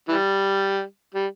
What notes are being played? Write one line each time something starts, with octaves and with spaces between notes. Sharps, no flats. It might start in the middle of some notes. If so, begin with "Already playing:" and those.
E3 G3
G3